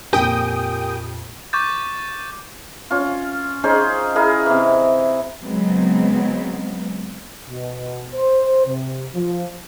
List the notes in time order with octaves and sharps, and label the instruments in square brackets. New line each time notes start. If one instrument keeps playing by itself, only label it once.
[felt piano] F2 A#2 B6 [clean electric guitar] G4 A#4 G#5 [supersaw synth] G5 D#6
[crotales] C#6 D6 G6 A6
[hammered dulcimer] C#4 F4
C#4 D#4 G#4 C5
E4 G#4 A#4 D#5
C3 E3
[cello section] C#3 F#3 G#3 B3 C4
[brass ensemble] B2
C5
C3
F3